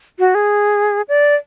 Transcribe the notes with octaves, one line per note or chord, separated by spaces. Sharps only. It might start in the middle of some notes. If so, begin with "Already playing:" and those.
F#4
G#4
D5